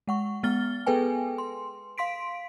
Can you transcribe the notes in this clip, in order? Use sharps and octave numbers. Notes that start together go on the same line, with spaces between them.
G#3 F#5 C#6
G#3 B3 F6 A6 G7
B3 G#4 A4 B4 G5 G#5
C6
F5 C6 B6 D7